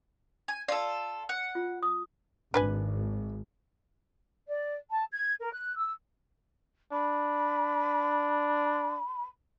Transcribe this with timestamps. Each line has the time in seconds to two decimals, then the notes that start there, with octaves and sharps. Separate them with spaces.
0.48 G#5
0.68 F4 A4 D5
1.29 F#5
1.55 F4
1.83 D#6
2.54 G#1 D4 B4 G#5
4.48 D5
4.90 A5
5.12 G#6
5.41 A#4
5.53 F#6
5.76 E6
6.92 D4 B5